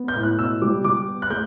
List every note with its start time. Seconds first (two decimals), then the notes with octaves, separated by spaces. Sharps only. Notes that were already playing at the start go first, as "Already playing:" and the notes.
Already playing: B3
0.08 G6
0.15 A2
0.23 F#6
0.38 B2 E6
0.62 G3 D6
0.84 G3 D6
1.08 B3
1.22 F#6
1.30 A3 G6